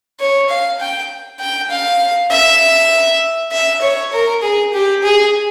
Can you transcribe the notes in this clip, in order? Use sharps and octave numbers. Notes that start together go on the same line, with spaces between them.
C#5
F5
G5
G5
F5
E5
E5
C#5
A#4
G#4
G4
G#4